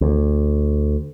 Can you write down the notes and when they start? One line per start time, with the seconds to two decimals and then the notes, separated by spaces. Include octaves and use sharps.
0.01 D2